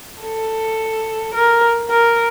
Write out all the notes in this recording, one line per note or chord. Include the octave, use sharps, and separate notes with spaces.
A4
A#4
A#4